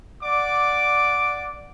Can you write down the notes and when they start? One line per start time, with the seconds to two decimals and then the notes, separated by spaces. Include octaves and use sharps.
0.24 D5 F#5 D6